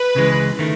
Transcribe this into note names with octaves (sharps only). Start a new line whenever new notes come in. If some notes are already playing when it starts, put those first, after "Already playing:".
Already playing: B4
C#2 C#3 E3 G#3
D#3 A3